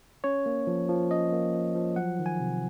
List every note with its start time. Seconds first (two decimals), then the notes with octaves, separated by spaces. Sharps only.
0.24 C#4 C#5
0.46 A#3
0.67 F3
0.89 F3
1.11 C#4 D#5
1.33 A#3
1.54 F3
1.75 F3
1.96 F#3 F#5
2.19 D#3
2.26 G#5
2.40 C3